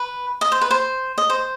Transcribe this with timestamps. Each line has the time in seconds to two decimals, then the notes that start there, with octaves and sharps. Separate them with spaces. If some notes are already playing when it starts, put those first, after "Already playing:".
Already playing: B4
0.41 D#5
0.52 C5
0.61 B4
0.71 C5
1.18 D#5
1.30 C5